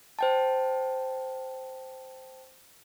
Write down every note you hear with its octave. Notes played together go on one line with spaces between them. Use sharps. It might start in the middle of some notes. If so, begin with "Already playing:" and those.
C5 G5 A5